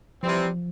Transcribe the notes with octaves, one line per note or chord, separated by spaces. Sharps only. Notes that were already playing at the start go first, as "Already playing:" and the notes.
C3 E3 F3 G3 C4